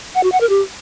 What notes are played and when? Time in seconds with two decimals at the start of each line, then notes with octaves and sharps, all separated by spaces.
0.15 F#5
0.23 F#4
0.32 F#5
0.40 A#4
0.49 G4